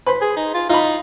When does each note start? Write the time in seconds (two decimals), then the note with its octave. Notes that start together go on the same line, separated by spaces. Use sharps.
0.06 B4 C5
0.22 G#4
0.37 D#4
0.54 F4
0.69 D#4 F4 B5